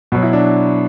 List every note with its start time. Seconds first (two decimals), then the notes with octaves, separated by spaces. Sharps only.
0.12 B2 F#3
0.23 E4
0.33 D4